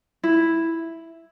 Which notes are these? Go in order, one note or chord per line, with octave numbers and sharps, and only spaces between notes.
E4